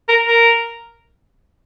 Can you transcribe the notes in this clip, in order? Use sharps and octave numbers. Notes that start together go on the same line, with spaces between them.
A#4
A#4